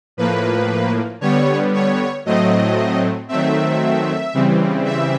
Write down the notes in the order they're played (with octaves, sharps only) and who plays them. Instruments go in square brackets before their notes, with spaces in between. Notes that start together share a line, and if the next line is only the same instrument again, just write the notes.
[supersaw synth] A2 F3 A#3 B4
D3 G3 B3 C#5
C#5
A2 F#3 A3 C4 D#5
D#3 F#3 A3 C4 E5
C#3 E3 G3 C4
E5